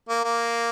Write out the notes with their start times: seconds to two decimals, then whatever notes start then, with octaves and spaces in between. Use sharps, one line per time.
0.09 A#3
0.24 A#3